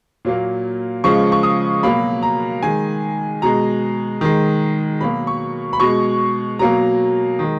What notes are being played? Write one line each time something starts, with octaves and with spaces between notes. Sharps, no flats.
A#2 F#3 A#3
C#3 F3 G#3 C#6
C#6
D#6
B2 F#3 A#3 B5
A#5
D#3 G#3 G#5
B2 G#3 A#5
D#3 G#3
B2 F#3 A#3 B5
C#6
B5
B2 G#3 C#6
B2 F#3 A#3 A#5
D#3 G#3